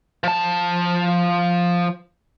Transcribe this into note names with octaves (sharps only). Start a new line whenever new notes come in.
F3 A5